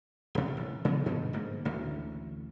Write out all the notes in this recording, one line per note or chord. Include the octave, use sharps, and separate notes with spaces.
D#1 C3
A1
C#3 F#3 B3
G2 B2 D#3 F#3
G#2 D3 A#3
A1 D2 D3